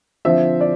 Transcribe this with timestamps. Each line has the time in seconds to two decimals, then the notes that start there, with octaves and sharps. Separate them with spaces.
0.25 D3 F3 C4 E5
0.61 D5